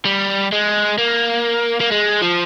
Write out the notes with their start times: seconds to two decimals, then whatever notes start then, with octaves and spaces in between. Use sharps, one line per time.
0.05 G3
0.53 G#3
0.98 A#3
1.81 A#3
1.92 G#3
2.22 F3